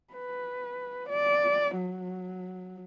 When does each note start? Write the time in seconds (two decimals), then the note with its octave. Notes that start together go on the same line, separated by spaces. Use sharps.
0.14 B4
1.09 D5
1.76 F#3